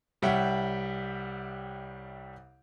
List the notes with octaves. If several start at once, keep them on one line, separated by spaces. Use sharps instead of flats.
C2 G3 C#5 E5 F#5 G5